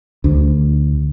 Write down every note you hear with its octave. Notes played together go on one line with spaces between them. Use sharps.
D2